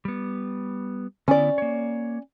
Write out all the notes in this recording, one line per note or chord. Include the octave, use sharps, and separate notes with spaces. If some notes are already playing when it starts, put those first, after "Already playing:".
G3 B3
D3 B3 C#4 E4 D5
A#3 C#5